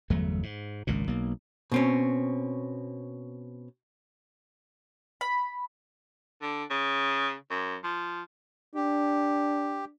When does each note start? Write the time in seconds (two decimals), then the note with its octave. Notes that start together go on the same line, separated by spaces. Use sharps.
0.10 G1 E2 F#3 A3
0.43 G#2
0.87 G#1 C#2 A#2
1.08 B1 A#3
1.72 B2 C4 C#4
5.21 B5
6.42 D3
6.70 C#3
7.50 F#2
7.84 F3
8.75 D4 G4